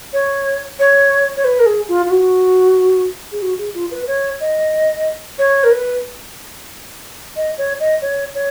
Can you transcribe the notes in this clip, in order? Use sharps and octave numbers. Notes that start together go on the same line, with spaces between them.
C#5
C#5
C#5
B4
A#4
G#4
F4
F4
F#4
G#4
F#4
G#4
F4
B4
C#5
D#5
C#5
A#4
B4
D#5
C#5
D#5
C#5
C#5